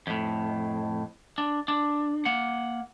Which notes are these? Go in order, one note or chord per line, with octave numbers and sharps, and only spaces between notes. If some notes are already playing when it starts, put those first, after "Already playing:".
F2 A2
D4
D4
A#3 F#5